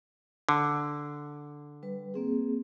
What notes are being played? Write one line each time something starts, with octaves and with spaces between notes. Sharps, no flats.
D3
G3 B4
A#3 C4 G#4